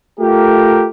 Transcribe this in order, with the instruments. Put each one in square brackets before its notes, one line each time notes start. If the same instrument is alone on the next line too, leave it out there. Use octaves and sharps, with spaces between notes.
[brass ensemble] A3 F4 G4 A#4